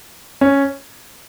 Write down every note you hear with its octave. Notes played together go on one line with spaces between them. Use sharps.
C#4